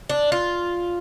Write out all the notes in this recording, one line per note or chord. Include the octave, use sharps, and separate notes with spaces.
D4
F4